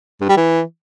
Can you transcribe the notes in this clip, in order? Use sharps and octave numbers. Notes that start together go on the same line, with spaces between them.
G2
G3
E3